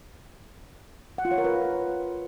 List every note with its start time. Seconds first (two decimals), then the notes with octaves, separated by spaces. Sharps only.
1.18 F#5
1.25 F4
1.31 C#5
1.38 A#4
1.45 B4